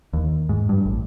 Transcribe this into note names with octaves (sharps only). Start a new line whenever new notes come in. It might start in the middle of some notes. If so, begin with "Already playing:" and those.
D#2
G#2
G2
A1